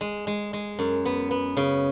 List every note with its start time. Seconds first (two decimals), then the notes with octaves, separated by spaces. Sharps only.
0.01 G#3
0.27 G#3
0.53 G#3
0.79 F#2
1.05 B3
1.31 B3
1.57 C#3